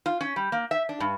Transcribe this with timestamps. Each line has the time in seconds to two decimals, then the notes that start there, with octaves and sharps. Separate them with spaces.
0.06 F4
0.21 C#4
0.36 G3
0.52 A#3
0.71 E5
0.89 D4
1.00 G2